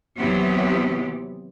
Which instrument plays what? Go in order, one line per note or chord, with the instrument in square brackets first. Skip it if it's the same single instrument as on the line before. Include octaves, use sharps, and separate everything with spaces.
[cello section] D#2 C3 E3 F#3 B3 G4